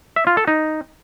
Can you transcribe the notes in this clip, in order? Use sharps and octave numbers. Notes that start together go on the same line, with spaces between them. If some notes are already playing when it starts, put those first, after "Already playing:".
E5
F4
A4
D#4